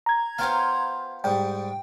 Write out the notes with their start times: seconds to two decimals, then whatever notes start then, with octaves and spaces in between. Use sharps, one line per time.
0.06 A#5 G#6
0.38 B3 F4 C5 F5 G5
1.24 G#2 G3 G5